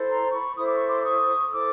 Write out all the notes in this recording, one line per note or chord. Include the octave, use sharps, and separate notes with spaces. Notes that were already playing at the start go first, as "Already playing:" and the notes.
Already playing: E4 A4 C5
A#5 C6
B5 C#6
E4 A4 C5 D#6
D6
C#6
C6 D6
C#6 D#6
E4 A4 C5 D6 E6